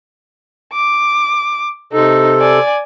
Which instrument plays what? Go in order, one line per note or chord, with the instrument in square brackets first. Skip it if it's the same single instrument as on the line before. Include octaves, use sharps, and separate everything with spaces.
[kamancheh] D6
[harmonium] C3 A4 [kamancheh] D#4
[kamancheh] D5 G#5